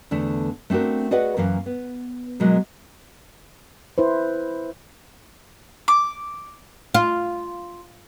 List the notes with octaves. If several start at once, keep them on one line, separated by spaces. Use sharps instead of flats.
E2 D3 A3 D4
A3 C4 D4 F#4 A#4
F#4 G#4 B4 D5 D#5 F#5
F#2 E3 A#3 F5
B3
B2 F#3 G#3 A#3
E4 B4 C5
D6
F4